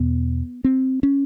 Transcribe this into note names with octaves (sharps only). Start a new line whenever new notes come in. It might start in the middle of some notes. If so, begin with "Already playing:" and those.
Already playing: E2 B2 B3
C4
C#4